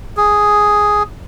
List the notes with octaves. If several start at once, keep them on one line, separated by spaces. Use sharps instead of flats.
G#4